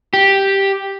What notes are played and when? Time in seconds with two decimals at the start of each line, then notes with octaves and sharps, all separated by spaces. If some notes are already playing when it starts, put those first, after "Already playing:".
0.13 G4